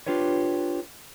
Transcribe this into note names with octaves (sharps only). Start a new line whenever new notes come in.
D4 F4 G4 B4 C#5